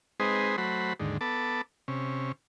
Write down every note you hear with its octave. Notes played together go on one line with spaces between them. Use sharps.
G#3 C4 D#4 G#4 B4 C5
F#3 A3 F#4 C5 B5
D#2 G#2 D3
B3 A4 A5 D6
C3 C#4